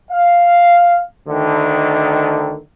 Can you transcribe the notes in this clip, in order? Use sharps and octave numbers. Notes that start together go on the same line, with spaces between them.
F5
D2 D3 D#3